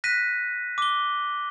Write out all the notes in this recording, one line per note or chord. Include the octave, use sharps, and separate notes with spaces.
F#6 A#6 B6 D#7
D6 G7